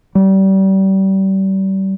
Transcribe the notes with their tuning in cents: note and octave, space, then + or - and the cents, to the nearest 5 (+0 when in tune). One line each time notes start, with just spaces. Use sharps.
G3 -30